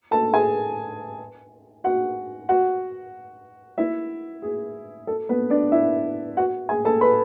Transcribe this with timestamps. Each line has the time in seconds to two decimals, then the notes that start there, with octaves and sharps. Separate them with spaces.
0.11 A4 A5
0.34 G#4 G#5
1.84 F#4 F#5
2.49 F#4 F#5
3.78 E4 E5
4.42 G#4
5.07 A4
5.29 B3 B4
5.50 D4 D5
5.72 E4 E5
6.37 F#4 F#5
6.69 G#4 G#5
6.85 A4 A5
7.01 B4 B5